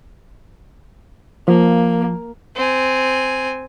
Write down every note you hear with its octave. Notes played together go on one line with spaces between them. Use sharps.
F3 A#3
C4 G#5